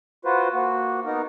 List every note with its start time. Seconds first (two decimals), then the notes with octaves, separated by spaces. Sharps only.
0.25 F4 F#4 B4 C5
0.53 A#3 F#4
1.05 B3 D#4 A#4